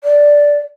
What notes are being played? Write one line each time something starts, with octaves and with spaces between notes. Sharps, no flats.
D5